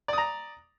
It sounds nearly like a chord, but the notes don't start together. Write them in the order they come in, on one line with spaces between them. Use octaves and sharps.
D5 D#6 A#5